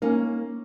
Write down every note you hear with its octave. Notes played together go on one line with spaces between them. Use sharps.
A#3 C#4 D#4 A#4 F5 G#5